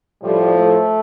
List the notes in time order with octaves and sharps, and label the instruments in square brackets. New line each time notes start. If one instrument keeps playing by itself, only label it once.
[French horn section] A2 F3 G3
A3